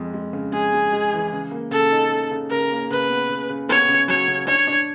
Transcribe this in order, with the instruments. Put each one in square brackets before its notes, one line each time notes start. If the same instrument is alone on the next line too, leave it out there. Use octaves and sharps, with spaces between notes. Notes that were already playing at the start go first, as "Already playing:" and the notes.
Already playing: [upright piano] F2 G#3
G#3
C#3
[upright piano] G#3 [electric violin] G#4
[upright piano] G#3
G#3
E3
C#3
A#3
[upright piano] C#3 [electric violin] A4
[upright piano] D#4
C#3
C#3
[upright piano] C#3 [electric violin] A#4
[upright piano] A#3
[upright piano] C#3 [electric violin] B4
[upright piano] B3
C#3
C#3
[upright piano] B3 [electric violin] C#5
[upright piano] C#3
[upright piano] F#3 [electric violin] C#5
[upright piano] C#3
[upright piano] D4 [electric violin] C#5
[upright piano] D4